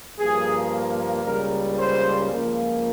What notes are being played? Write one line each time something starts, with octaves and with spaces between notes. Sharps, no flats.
G2 F3 A#3 G#4
C#2 C#3 G3 A#3 A#4
C5
C#2 C#3 F3 A#3